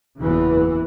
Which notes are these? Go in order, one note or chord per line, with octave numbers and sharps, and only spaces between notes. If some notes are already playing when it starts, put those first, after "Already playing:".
F#1 E2 C#3 E3